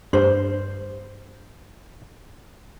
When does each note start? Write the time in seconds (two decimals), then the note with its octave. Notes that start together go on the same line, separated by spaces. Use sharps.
0.13 G2 C5